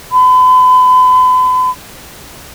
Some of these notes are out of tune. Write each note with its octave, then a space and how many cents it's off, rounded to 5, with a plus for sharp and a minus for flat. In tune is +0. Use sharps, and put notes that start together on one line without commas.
B5 +40